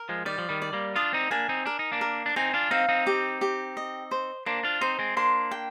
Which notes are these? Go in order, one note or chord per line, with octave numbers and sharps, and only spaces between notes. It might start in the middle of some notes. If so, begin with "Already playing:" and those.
Already playing: A#4
F3 G#3
D#3 G3 D5
F3
D#3 G3
D5
G3 A#3
D4 F4 D#6
C4 D#4
A#3 D4 G#5
C4 D#4
D4 A#4
D#4
A#3 D4
A#4
D4
C4 D#4 G#5
D4 F4
C4 D#4 F5
C4 D#4
G4
G4
D#5
C5
A#3 D4 C5
D4 F4
C4 D#4 C5
G#3 C4
A#3 D4 C6
G5